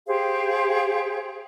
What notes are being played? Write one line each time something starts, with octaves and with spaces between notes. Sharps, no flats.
G4 G#4 C5 F5